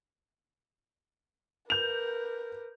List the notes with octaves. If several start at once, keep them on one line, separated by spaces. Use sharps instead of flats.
A#4 B4 G6 F7